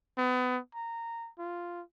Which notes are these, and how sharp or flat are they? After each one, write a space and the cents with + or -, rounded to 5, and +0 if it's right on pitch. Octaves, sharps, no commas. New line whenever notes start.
B3 +30
A#5 -15
F4 -5